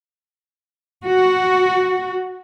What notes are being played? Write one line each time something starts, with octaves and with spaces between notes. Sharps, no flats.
F#4